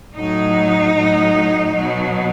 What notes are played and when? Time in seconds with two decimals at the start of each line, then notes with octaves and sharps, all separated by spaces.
0.14 A2 F#3 D#4
0.95 A2 F#3
1.74 B2 F#3